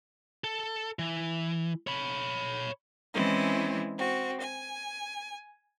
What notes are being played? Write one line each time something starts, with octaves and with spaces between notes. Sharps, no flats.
A4
E3
C#5 B5
E3 G#3 C4 C#4 E4
C4 F#4
G#5